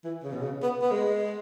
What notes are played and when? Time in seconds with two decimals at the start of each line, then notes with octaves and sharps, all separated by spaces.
0.04 E3
0.23 C#3
0.33 B2
0.43 C#3
0.62 B3
0.82 B3
0.91 G#3